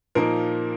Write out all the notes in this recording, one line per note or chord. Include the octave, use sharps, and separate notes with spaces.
A#2 F3 A#3 D#4 A#4